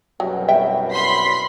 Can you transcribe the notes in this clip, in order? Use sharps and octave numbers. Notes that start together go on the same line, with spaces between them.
C2 F#2 B2 F#3 G4
G3 E5 G5
B5 C6 B6